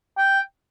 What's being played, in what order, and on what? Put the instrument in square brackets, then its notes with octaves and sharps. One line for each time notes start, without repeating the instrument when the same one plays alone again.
[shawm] G5